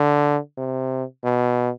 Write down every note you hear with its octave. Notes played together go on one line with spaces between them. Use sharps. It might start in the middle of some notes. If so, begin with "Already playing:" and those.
Already playing: D3
C3
B2